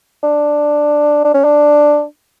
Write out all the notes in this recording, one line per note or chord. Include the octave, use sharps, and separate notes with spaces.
D4
D4
C#4
D4